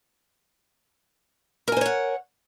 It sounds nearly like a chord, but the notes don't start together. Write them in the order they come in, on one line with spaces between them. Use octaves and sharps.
A#4 G#5 C5 C#5 F#5